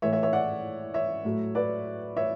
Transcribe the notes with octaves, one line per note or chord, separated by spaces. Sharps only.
A2 E3 A3 C#5 E5
C#5 E5
C#5 E5
D5 F#5
C#5 E5
A2 F#3 A3
B4 D5
C#5 E5